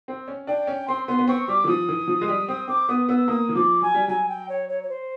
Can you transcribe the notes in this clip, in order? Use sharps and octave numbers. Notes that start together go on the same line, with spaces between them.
C4
C#4
D4 G5
C#4
C4 C6
B3 C6
B3
C4 C#6
G3 D6
E3
F3 D#6
E3
F3
G#3
G3
C4 D#6
C4 D6
B3 D#6
B3 E6
A#3 D#6
E3
F3 D6
F#3 G#5
G3
F#3 G#5
G5
C#5
C#5
C#5
C5